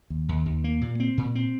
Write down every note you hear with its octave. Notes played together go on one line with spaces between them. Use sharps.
D#2
D#2
D#2
A#3
A#2
C4
A#2
C4